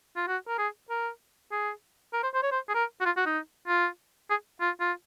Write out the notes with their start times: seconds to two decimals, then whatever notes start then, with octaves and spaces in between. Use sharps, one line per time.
0.16 F4
0.27 F#4
0.48 A#4
0.58 G#4
0.90 A#4
1.51 G#4
2.13 A#4
2.23 C5
2.34 C5
2.43 C#5
2.51 C5
2.69 G#4
2.74 A#4
3.01 F#4
3.05 F4
3.17 F#4
3.26 D#4
3.68 F4
4.30 G#4
4.61 F4
4.80 F4